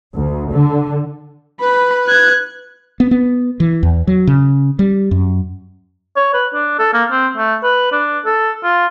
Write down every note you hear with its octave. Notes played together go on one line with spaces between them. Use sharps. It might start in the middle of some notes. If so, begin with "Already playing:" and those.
D2
D3
B4 B5
F#6 G#6
B3
B3
E3
E2
F#3
C#3
G3
F#2
C#5
B4
D4
A4
A#3
C4
A3
B4
D4
A4
F4